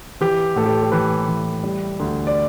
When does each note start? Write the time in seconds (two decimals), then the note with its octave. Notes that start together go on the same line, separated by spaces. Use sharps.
0.21 E3 G4
0.56 A2 A4
0.66 G4
0.83 G4
0.92 E3 B4
1.28 E3
1.63 G3
2.00 D2
2.27 D5